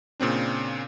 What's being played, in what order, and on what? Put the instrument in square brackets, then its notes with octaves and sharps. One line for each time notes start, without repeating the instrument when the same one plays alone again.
[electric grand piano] A#2 C#3 C4 D4